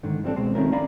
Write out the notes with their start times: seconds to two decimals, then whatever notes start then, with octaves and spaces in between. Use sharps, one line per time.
0.03 G#2 D3 D#3
0.24 F3 G3 C4 D4 A4
0.36 C#2 B2 G#3 C4
0.55 D#3 F3 A3 C4 C#4 A#4
0.72 D4 D5 F5 G#5 A#5 B5